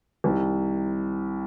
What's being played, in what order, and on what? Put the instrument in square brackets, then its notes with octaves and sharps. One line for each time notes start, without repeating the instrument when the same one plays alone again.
[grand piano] C2 C3 D#3